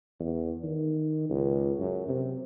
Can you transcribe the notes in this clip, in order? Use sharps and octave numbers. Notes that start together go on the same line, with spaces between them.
E2
D#3
C#2
F#2
C3